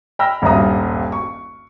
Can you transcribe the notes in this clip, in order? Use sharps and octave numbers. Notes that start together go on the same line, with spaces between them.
G5 B5 E6 F6 A#6
D#1 G#1 G2 E5 A#5 D#6
C#6